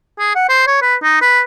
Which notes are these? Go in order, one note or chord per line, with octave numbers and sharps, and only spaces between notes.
G#4
F#5
C5
C#5
B4
D#4
B4